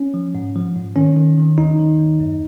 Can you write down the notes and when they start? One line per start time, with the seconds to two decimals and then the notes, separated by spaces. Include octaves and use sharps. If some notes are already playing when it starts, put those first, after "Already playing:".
Already playing: C#4
0.14 F3
0.35 G#2
0.56 F3
0.76 G#2
0.96 D#3 C#4
1.16 D#3
1.38 D#3
1.58 D#2 D#4
1.79 D#3
1.99 D#2
2.20 F#2